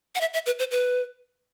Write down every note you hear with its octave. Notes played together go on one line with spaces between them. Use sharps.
F#5
E5
E5
B4
C5
B4